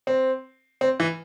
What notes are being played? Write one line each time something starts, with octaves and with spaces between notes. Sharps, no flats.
C4
C4
E3